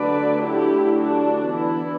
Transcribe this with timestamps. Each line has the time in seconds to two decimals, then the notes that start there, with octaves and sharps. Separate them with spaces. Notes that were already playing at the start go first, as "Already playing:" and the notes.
Already playing: D3 F#3 A3 D4 B4 D5
0.43 E4 G4
0.97 D4 F#4
1.52 E3 B3 D4 E4